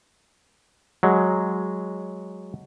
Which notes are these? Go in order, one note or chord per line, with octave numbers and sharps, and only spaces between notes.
F#3 G#3